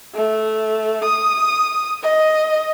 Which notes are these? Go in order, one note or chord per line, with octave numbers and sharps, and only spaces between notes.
A3
D#6
D#5